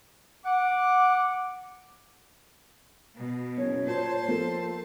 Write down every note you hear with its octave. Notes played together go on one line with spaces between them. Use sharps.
F#5 D6
B2
F#1 C#5
A#2 C5 A5
F3 A#3 A4